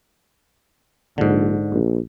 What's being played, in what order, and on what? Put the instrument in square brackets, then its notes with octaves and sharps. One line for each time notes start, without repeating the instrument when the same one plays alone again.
[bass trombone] A#1 [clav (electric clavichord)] G#2 D3
[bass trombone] A#1